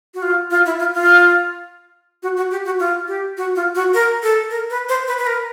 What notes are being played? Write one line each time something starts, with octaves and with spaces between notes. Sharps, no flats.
F#4
F4
F4
E4
F4
F4
F#4
F#4
G4
F#4
F4
G4
F#4
F4
F#4
A#4
A4
A#4
B4
C5
B4
B4
A#4